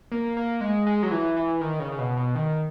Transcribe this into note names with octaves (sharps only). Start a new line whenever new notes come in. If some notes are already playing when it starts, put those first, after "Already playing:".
A#3
A#3
G#3
G#3
F#3
E3
E3
D#3
C#3
C#3
B2
B2
D#3